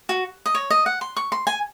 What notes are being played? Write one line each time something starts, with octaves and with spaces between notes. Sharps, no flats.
F#4
D#5
C#5
D#5
F#5
C6
C#6
C6
G#5